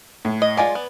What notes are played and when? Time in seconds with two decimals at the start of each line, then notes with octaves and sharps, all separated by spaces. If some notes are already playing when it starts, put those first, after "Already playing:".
0.25 A2
0.42 D#5
0.57 G#3 F4 D5 G#5
0.75 B3